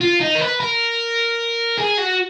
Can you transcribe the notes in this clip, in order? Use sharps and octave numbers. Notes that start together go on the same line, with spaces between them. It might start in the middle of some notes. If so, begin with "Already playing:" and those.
F4
D#4
A#4
B4
A#4
G#4
F#4